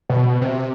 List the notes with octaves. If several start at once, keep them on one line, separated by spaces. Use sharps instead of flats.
B2
C3